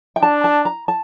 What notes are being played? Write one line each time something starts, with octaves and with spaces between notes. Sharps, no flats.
G5
D4 A5
A5
A#5
A5